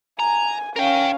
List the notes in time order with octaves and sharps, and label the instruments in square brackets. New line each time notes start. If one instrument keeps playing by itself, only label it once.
[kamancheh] G#5 [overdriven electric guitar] A#5
[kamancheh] C#4 F5 [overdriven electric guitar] A#4 G5